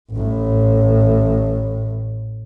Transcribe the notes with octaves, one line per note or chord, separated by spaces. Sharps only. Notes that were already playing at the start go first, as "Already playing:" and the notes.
A1 A2